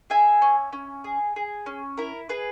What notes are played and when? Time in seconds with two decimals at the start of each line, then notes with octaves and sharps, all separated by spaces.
0.10 G#4 E5 G#5
0.42 C#4
0.73 C#4
1.04 G#4
1.36 G#4
1.66 C#4
1.97 E4 A#4
2.29 G#4 B4